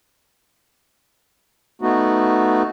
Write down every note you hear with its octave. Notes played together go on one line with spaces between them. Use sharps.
A3 B3 D#4 F#4